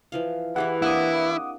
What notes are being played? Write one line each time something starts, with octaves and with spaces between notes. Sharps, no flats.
E3 F3 F5
E3 E4 G4 G#4 F#5
A#3 C4 D4 E4 F#5 D6 D#6